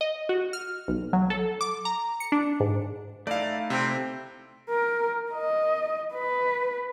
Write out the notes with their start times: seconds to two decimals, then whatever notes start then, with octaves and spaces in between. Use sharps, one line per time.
0.01 D#5
0.29 F#4
0.53 F6
0.88 B1
1.13 F#3
1.30 A4
1.61 D6
1.85 A#5
2.20 C#7
2.32 D4
2.60 G#2
3.27 A3 D#4 E4 D5 F5
3.70 C3 C4
4.70 A#4
5.32 D#5
6.14 B4